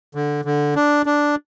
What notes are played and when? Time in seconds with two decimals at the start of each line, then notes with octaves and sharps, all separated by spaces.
0.15 D3
0.45 D3
0.76 D4
1.06 D4